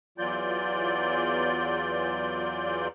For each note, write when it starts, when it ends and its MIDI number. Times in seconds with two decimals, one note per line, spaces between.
0.18 2.88 40
0.18 2.88 52
0.18 2.88 54
0.18 2.88 65
0.18 2.88 74
0.18 2.88 91